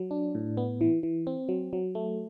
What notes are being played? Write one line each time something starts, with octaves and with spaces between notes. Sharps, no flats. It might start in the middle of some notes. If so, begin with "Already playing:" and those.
Already playing: F#3
D4
A2
B3
E3
E3
C4
F#3
F#3
A3